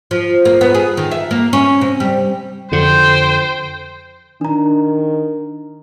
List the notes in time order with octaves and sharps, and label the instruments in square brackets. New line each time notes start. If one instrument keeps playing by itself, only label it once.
[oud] F3
A#3
B3
G#4
D#3
E5
A#3
C#4
C3
G3
[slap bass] F2 D3 [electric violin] C5 G5
[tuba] D#3 [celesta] D4 A#5